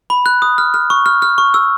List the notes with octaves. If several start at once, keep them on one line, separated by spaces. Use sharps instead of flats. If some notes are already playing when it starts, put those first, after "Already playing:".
B5
F#6
D#6
F6
F6
C#6
F6
F6
C#6
E6